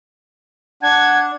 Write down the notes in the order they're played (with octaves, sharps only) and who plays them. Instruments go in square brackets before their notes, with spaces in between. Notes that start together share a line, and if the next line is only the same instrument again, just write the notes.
[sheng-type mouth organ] D4 [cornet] F#5 [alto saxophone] A5 [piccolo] G#6